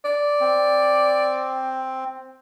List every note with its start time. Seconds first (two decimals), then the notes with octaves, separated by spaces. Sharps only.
0.05 D5
0.41 C4